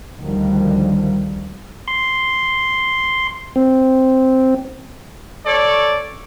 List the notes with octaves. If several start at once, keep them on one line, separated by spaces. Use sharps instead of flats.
D2 D3 D#3 F3 G3
C6
C4
A4 C#5 D5